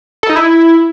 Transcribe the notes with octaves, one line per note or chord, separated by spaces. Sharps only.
A4
D#4
E4